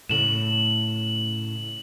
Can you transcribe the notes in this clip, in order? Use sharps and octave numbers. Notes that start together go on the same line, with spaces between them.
A2 C#3 A3 E7 F#7